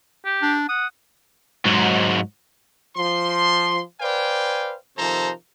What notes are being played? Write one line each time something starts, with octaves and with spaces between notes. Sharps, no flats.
G4
D4
F#5 D#6
G#2 F#3
F3 C6
B4 C5 D5 F5 G5 G#5
C3 D#3 F3 A4 C5 A#5